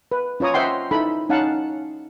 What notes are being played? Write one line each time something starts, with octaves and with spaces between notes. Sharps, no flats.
B4
C#4 F4 C#5 A#5 D#6
C5 D#5 E5 F#5 G5 C6
D#4 E4 A4 B5
C#4 D#4 F5 F#5 A5